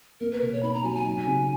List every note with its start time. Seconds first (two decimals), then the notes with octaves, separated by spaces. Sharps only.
0.20 A#3 A#4
0.31 B4
0.41 B2 A#4
0.52 C#5
0.63 D#4 B5
0.74 A#5
0.84 F#3 G#5
0.91 A#5
0.95 G#5
1.05 D#4
1.26 C#3